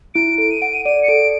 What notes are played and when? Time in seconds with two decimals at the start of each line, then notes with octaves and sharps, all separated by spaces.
0.14 E4 D7
0.38 A4 D7
0.51 D#7
0.61 F#5 D7
0.74 D#7
0.85 D5 D#7
1.03 C#7
1.08 A4 D7